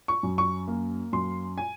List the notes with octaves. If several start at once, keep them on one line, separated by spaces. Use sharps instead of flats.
C#6
F#2
C#6
A#3
F#2 C6
G#5